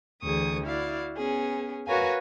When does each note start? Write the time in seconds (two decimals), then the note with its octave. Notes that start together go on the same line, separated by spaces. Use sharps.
0.23 D2 E3 G#4 C#6 D#6
0.63 E4 F#4 D5 F5
1.17 B3 C#4 G#4
1.86 F#4 A#4 B4 C#5 F5 G#5